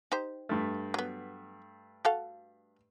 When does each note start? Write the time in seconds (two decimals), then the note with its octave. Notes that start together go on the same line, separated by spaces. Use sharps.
0.12 D#4 G4 C5
0.49 G2 A3
0.94 F#3 B3
2.05 F#4 A4 F5